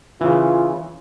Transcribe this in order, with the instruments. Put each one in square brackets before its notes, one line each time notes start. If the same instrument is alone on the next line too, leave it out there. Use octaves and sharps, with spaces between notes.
[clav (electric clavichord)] C#3 E3 [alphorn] F4